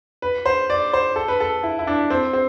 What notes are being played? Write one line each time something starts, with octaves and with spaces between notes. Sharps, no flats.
B4
C5
D5
C5
A4
B4
A4
E4
E4
D4
C4
C4